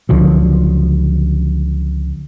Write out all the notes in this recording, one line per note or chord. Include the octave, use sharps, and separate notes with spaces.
C#2 D3 F3 F#3